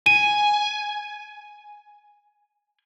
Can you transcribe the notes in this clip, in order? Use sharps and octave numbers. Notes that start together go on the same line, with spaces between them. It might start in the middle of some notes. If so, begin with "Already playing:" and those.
G#5 D#7